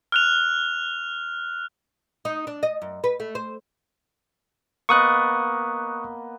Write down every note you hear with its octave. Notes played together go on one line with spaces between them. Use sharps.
F6 F#6 F7
D#4
D4
D#5
F#2
B4
A3
C5
A#3 B3 D#5 C#6 D#6 F#6